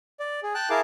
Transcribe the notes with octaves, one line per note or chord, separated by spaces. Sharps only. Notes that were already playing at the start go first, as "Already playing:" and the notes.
D5
G#4
G5 A5 F#6
E4 G#4 A#4 F5 A5 D6